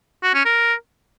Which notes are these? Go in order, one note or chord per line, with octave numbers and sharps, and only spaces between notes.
F#4
C#4
A#4